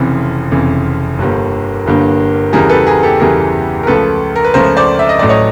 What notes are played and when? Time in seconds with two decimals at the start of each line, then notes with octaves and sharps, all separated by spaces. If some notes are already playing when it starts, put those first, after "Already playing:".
Already playing: F1 F2 C#3 E3
0.51 F1 F2 C#3 E3
1.18 G1 G2 D3 G3 A#3
1.85 G1 G2 D3 G3 A#3
2.53 E2 C#3 E3 G3 G#4 A#4
2.69 A4 B4
2.87 G#4 A#4
3.03 G4 A4
3.20 E2 C#3 E3 G3 G#4 A#4
3.83 A#4
3.87 C#2 C#3 F3 A3 A4 B4
4.36 A#4
4.44 B4
4.54 C#2 C#3 F3 A3 A#4 C5
4.77 C5 D5
4.99 E5
5.09 D#5
5.19 A1 A2 F#3 A3 D5
5.29 C#5 D#5